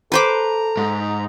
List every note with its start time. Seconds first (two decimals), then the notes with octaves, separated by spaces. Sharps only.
0.12 A4 B4 C5 A#5 D6
0.77 G#2